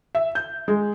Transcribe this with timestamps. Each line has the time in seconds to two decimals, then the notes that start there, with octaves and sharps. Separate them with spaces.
0.15 E5
0.35 G6
0.68 G#3